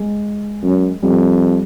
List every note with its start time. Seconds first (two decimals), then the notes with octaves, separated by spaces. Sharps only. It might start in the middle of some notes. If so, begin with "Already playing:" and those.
Already playing: G#3
0.63 F#2
1.03 F2 G3